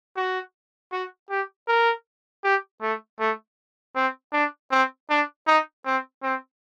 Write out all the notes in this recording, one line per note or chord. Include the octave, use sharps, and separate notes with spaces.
F#4
F#4
G4
A#4
G4
A3
A3
C4
D4
C4
D4
D#4
C4
C4